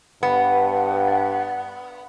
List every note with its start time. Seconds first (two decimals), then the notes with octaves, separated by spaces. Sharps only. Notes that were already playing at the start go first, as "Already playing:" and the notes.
0.23 G2 B3 F#5